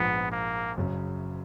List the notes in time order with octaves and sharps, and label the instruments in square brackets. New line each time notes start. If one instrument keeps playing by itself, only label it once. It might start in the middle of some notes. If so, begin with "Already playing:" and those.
Already playing: [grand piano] A#1 G#2 F3 [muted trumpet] B3
[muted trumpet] A#3
[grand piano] F#1 F#2 C#3